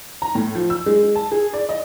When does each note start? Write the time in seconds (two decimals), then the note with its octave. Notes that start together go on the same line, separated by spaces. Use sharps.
0.22 A#5
0.35 A2
0.55 F3
0.70 E6
0.86 G#3
1.03 G#3
1.15 A5
1.32 G#4
1.53 D5
1.69 D#5